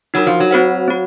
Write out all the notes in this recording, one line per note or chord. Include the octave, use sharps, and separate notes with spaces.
F#3 D#4 F#4 A#4
F3
F#3
C4 F#4 C5 F#5
C4 F#4